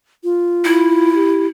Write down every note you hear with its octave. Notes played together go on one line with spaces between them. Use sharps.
F4
E4
G4